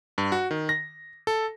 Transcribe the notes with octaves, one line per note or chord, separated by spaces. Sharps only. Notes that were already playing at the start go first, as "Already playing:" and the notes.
G2
F#4
D#3
A#6
A4